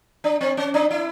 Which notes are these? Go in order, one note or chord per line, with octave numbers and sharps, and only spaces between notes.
D4
C4
C#4
D4
E4